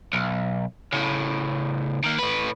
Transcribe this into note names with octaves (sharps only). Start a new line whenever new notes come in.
B1
A2 C#3
D#3 A#3
A2 B4